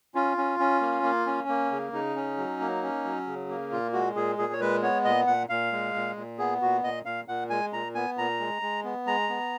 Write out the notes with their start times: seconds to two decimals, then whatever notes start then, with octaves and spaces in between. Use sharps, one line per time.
0.15 C#4 F4
0.37 C#4
0.60 C#4
0.81 A#3
1.03 A#3
1.26 C#4
1.48 A#3
1.71 C#3
1.93 C#3 D#4
2.16 C#4
2.37 F#3
2.61 A#3
2.83 C#4
3.05 F#3
3.27 C#3
3.49 A#3
3.72 A#2 F4
3.93 G#3 F#4
4.15 A#2 G#4
4.38 A#2 G#4
4.53 C#5
4.61 G#3 B4
4.82 B3 C#5
5.05 A#2 D#5
5.27 A#2 F#5
5.49 A#2 F5
5.72 G#3
5.95 A#2
6.16 A#2
6.39 B3 G#4
6.61 A#2 F#4
6.84 A#2 D#5
7.05 A#2 F5
7.28 A#2 F#5
7.50 G#3 G#5
7.73 A#2 A#5
7.95 B3 G#5
8.17 A#2 A#5
8.40 G#3
8.62 G#3
8.84 B3
9.07 G#3 A#5
9.29 B3